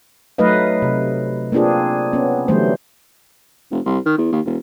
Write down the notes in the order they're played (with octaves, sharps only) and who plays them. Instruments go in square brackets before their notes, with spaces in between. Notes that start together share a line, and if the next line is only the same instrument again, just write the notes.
[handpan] F#3 A3 D#4 B4 D#5 F5
C3
A#3 C4 D4 F4 G#4
B3 C#4
D3 E3 F#3 G3 A3 C5
[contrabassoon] F1
C2
D#3
E2
D#2
E1